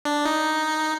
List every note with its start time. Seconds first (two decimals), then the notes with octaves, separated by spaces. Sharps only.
0.05 D4
0.25 D#4